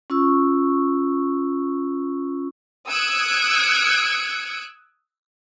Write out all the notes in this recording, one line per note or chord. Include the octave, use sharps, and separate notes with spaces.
C#4 F4 C#6 E6
D#6 E6 F#6 G#6 C#7 D7